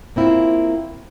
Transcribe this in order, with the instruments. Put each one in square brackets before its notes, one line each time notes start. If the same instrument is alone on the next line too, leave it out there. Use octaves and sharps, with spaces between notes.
[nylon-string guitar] A#3 C4 E4 F4